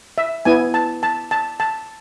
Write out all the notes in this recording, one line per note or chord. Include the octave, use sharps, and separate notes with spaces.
E5
B3 E4 G#5
A5
A5
A5
A5